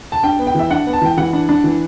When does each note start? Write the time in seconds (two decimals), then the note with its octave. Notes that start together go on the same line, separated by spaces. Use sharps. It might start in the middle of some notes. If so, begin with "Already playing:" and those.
0.12 A5
0.23 D4 G5
0.39 B3
0.47 G5
0.55 E3 E5
0.71 D4 F#5
0.86 B3
0.93 A5
1.02 E3 G5
1.18 E3 F#5
1.33 D4
1.49 D4
1.64 E3